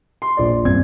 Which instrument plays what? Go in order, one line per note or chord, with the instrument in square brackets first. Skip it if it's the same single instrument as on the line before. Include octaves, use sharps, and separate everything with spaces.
[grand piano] C6
A#1 D5
[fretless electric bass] D#1 G2 C4 [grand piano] G#6